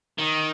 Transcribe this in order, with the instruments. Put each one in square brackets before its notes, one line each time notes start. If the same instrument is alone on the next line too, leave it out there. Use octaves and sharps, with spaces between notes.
[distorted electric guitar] D#3